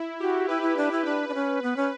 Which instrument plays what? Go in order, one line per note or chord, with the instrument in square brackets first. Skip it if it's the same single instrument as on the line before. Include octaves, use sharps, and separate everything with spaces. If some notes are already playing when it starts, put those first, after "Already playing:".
Already playing: [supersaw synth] E4
[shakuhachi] F#4 [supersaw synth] G4
[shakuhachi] E4 [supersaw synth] B4
[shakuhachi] E4
D4
E4
[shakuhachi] D4 [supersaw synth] B4
[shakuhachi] D4
C#4
B3
C#4